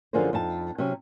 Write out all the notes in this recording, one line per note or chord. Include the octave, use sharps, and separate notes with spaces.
F#2 D3 F3 G#4 A#4 C5
F2 D#4 A5
C3 F#3 C#4